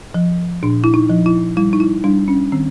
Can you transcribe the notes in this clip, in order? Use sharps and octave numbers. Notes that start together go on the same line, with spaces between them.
F3
A#2 D4
E4
D#4
F3
E4
G3 E4
D#4
E4
G3 D4
C#4
D#3 C4